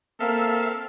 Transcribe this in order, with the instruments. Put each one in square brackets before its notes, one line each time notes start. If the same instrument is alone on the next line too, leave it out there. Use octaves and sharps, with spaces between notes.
[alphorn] A#3 [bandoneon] C4 A#4 [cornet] A4 [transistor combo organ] E5 F5